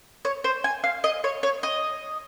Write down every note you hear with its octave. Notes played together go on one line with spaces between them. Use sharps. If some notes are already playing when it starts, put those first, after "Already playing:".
C#5
C5
G#5
F5
D#5
C#5
C#5
D#5